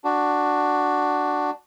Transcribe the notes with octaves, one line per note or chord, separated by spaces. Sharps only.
D4 F#4